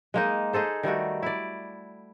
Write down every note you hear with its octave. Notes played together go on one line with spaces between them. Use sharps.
G#3 A#3 D#4
D#4 G#4 A4 C5
D#3 G3 A3 F#4
E4 D5